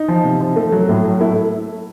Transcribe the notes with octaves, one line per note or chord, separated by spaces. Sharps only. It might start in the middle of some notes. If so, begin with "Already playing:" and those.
Already playing: D#4
F3
C3
F3
A3
F#3
A2
F#3
A3 E4